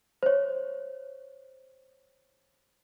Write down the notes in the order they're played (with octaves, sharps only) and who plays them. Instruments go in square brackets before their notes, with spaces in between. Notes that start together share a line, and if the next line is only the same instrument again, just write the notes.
[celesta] C5 C#5